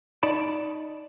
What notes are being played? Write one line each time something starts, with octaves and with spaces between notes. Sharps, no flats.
D#4 D5 A5 B5